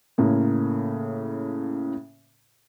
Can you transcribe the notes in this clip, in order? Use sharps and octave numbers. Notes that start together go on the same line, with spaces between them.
A2 C#3 A#3